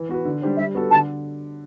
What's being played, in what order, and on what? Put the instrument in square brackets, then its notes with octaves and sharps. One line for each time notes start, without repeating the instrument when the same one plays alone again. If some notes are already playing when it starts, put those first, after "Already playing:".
Already playing: [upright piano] E3
B3 F#4 B4
D3
G3 D4 G4 C5
[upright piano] G3 [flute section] E5
[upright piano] B3 F#4 A4
[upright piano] D3 [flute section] A5